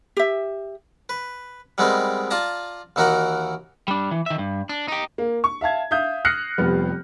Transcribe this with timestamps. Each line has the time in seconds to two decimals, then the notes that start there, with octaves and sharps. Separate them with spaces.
0.17 G4 E5
1.09 B4
1.78 G3 G#3 B3 C4 D#4 A#4
2.31 F4 D5 A5 A#5
2.96 D#2 E3 D#4 F#4 A#4 F#5
3.88 G3 D4
4.11 E3
4.26 D#3 E5
4.38 G2
4.69 D4
4.88 D#4 G4
5.18 A#3
5.44 C#6
5.61 E5 F5 A5 G#6
5.91 E5 F5 D#6 G6
6.25 D#6 F6 F#6 A#6 C7 C#7
6.58 F1 F3 G3 B3